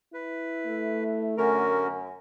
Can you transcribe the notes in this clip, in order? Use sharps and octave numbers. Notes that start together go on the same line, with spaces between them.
E4 B4
A3
F#2 D3 C#4 F#4 A#4